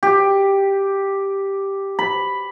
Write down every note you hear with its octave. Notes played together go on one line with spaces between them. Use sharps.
G4
B5